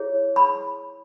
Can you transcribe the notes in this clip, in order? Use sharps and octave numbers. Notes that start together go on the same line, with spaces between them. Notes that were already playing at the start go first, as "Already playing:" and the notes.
Already playing: E4 G#4 C#5
B5